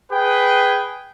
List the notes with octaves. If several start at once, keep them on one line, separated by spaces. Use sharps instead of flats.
G#4 B4 G5